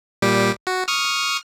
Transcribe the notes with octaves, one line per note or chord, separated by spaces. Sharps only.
A#2 G3 G4
F#4
C#6 D#6 F6